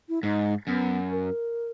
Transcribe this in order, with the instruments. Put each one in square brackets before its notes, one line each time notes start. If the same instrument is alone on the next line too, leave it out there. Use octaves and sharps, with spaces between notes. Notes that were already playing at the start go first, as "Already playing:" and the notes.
[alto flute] E4
[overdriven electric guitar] G#2 [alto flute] D#4
[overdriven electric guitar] F#2 [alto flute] B3
[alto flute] A#4